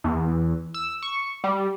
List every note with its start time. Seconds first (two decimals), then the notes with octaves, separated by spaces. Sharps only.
0.04 E2
0.74 E6
1.02 C#6
1.44 G3